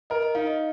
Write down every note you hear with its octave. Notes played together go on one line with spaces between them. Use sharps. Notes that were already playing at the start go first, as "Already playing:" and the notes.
A#4 D#5
D#5
D#4 F5
D#5